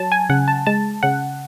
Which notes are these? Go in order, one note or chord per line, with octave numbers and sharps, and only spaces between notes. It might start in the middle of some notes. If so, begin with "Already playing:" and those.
Already playing: F#3 A5
G#5
C#3 F#5
A5
G#3 A5
C#3 F#5